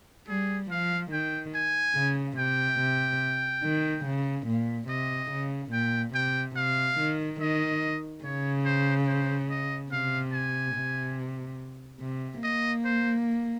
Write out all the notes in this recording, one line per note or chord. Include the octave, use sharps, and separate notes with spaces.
G3 G#4
F3 F5
D#3 G5
G#5
C#3
C3 G5
C3
D#3
C#3
A#2
C3 D#5
C#3
A#2 G5
C3 G5
C3 F5
D#3
D#3 D#5
C#3 C#5
C5
C5
D#5
C3 F5
G#5
C3
C3
A#3 D#5
C5